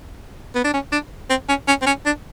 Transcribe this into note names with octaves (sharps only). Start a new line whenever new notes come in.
B3
D4
C#4
D4
C4
C#4
C#4
C4
C#4
D4